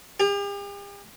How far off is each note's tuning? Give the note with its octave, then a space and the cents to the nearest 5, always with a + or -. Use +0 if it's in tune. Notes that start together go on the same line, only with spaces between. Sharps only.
G4 +45